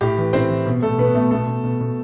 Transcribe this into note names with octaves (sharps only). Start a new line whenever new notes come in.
A2 G4
E3
A2 C4 C5
E3
B2
B2 A3 A4
B2 B3 B4
B2 A3 A4
B2 A3 A4
B2
B2
B2